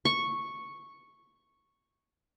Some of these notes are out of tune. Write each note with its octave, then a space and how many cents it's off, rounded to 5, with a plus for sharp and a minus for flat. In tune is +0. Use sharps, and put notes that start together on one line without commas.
C#6 -5